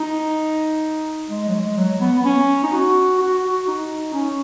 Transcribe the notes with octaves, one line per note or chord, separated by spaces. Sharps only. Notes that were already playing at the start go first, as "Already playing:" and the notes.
Already playing: D#4
G#3
F#3
G#3
F#3
B3
B3
C#4
D#4
F#4
F#4
F#4
D#4
C#4